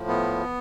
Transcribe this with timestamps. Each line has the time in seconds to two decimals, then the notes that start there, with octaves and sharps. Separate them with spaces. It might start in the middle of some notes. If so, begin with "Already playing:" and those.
Already playing: A2 F3
0.08 B3